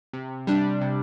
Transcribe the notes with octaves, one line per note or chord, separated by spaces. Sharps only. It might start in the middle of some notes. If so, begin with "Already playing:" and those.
C3
G3 D4
C3